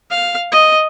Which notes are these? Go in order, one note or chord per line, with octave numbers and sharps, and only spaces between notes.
F5
D#5